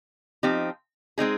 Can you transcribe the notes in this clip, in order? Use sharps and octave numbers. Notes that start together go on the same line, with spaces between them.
F3 C4 D#4 G4
G#3 C4 D#4 G#4